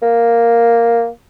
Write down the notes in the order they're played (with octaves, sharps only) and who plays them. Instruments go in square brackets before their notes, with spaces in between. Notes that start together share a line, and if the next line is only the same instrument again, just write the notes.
[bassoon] A#3